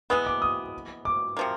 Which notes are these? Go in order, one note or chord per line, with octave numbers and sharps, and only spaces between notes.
E3 G#3 B3 D#6
D6
D#6
D6
C3 F3 A#3